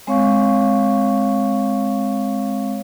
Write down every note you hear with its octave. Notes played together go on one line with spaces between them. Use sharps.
G#3 C4 C#5 F5 C#6